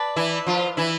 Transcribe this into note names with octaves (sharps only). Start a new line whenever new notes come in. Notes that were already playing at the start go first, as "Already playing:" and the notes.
Already playing: B4 D5 A5
E3 E4
F3 F4
E3 E4